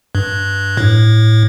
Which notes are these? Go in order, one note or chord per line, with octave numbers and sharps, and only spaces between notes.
G2
A2